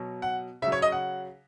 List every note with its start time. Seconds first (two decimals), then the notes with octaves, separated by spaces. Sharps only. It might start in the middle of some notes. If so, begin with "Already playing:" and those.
Already playing: B2 F#3
0.22 F#5
0.62 C#3 E5
0.67 F#3
0.72 C#5
0.82 D#5
0.92 F#5